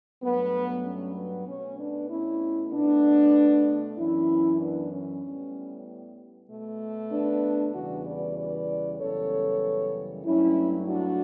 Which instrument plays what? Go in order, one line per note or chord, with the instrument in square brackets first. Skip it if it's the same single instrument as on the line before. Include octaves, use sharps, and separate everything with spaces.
[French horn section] G2 F#3 A3 B3
C#4
B3
B2 A3 C#4
B3 D4
C#4 E4
B2 A3 B3 D4
F#2 E3 B3 C#4 E4
B3 D4
C#4
A2 G3 B3
B2 A3
B3 D4
E2 C#3 E3 G3 B3 D4 F#4
B4 D5
B4 D5
F#2 C#3 E3 G3 B3 A4 C#5
G2 F#3 A3 C#4 E4
D4 F#4